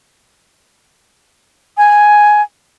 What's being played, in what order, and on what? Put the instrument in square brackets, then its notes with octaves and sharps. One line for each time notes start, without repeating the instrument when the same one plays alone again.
[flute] G#5